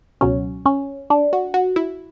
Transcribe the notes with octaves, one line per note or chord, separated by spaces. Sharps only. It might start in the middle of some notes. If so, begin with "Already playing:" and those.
C#2 B2 F#3 C#4
C#4
D4
F#4
F#4
E4